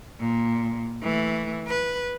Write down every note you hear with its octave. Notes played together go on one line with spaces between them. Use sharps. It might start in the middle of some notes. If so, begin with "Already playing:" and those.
A#2
E3 A3
B4